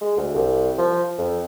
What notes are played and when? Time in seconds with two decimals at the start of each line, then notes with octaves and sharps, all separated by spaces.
0.01 G#3
0.17 D2
0.35 C2
0.78 F3
1.18 F2